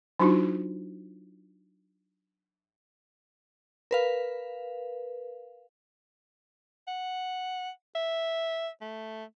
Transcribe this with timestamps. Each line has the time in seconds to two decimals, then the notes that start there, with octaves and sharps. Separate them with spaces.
0.20 F#3 D4 D#4 F4 F#4
3.91 A#4 B4 F5
6.88 F#5
7.95 E5
8.81 A3